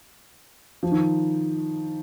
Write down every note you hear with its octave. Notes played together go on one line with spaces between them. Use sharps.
F3
D#3